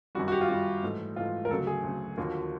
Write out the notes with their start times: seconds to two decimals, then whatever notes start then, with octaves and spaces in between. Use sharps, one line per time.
0.15 F#2 D#3 G3 F#4
0.28 F#4
0.32 G4
0.41 F4
0.49 F#2 D#3 G3 F#4
0.83 G#2 E3 A3
1.16 G#2 E3 A3 F4
1.45 A#4
1.49 D2 C#3 F#3 A4
1.67 G#4
1.83 D2 C#3 F#3
2.17 D#2 D3 F3 A#3 F#4